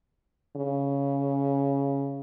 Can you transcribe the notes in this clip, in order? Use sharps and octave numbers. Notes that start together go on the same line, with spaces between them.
C#3